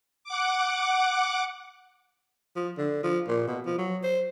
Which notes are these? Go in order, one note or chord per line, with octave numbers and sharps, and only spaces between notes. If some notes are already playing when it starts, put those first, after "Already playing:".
F#5 D6
F3
D3
F3
A#2
B2
F3
F#3
C5